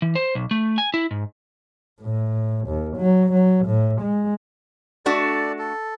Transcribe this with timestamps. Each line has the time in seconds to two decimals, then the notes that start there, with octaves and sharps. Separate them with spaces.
0.02 E3
0.15 C5
0.35 B1
0.51 A3
0.78 G#5
0.94 E4
1.11 G#2
2.02 A2
2.68 D#2
2.97 F#3
3.33 F#3
3.66 A2
4.02 G#3
5.06 A3 D4 F#4 A4 D5
5.59 A4